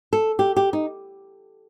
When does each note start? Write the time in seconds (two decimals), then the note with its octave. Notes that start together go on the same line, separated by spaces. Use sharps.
0.13 A4
0.39 G4
0.56 G4
0.73 D#4